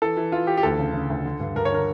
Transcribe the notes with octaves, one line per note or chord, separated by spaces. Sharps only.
E3 A4
E3
E3 F4
E3 G4
G4
D2 A4
C#3
C#3
D2
D3
G2
G2 A#4
C#5
D3 A#4